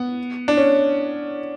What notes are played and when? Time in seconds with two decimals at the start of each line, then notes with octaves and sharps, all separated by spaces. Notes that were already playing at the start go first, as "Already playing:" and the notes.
Already playing: B3
0.48 D4
0.57 C#4